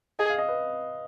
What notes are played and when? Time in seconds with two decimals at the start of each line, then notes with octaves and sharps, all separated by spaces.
0.19 G#4 D#5
0.30 F5
0.38 D#5
0.48 B4